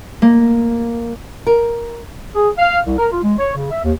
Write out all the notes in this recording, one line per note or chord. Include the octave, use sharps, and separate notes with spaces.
A#3
A#4
G#4
F5
C2
A#4
F4
G#3
C#5
C#3
E5
D#2